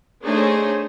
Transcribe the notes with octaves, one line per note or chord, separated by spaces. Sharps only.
A3 D4 D#4 G#4 C5 C#5